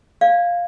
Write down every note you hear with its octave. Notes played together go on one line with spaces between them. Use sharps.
D5 F5